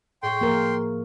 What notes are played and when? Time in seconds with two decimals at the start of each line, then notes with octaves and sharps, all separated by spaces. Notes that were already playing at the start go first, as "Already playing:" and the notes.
0.23 A2 G#4 G5 C6 C#6
0.41 F3 A#3 A#4